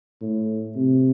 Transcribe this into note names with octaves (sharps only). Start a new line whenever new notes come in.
A2
C3